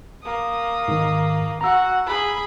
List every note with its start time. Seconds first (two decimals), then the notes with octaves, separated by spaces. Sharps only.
0.23 A#3 D#6
0.88 G#2 D#3
1.61 F#4 F#5 A#5 E6
2.06 G#4 B5